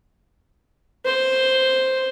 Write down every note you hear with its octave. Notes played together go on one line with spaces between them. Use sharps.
C5